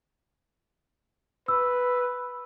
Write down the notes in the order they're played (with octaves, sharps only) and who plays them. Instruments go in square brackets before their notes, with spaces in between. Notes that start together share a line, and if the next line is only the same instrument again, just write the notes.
[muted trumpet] B4 [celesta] E6